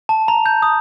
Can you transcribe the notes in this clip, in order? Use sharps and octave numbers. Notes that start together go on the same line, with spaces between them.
A5
A#5
G6
D#6